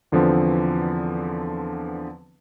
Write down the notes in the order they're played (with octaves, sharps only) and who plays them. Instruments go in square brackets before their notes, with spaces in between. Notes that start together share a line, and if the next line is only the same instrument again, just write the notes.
[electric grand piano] E2 D3 F3 B3 C4